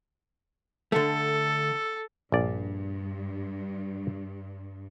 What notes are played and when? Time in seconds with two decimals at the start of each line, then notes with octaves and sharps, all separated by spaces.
0.92 D3 A3 A4
2.32 A#1 G2 D5